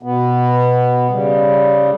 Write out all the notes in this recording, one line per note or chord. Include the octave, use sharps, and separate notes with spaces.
B2 B3
C#3 G3